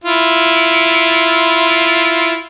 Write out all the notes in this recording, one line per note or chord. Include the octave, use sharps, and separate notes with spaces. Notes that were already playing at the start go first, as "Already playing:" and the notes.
E4 F4